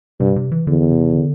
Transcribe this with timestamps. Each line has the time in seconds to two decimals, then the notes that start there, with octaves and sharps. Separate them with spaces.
0.20 G2 C3
0.36 C3
0.52 E3
0.67 E2 D3
0.91 C3
1.14 D3